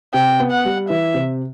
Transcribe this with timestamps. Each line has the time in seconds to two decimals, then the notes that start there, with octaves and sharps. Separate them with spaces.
0.14 C3 G5
0.40 B3
0.52 F#5
0.65 G3
0.89 E3 E5
1.14 C3